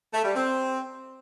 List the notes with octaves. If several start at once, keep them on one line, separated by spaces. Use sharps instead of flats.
A3
G3
C4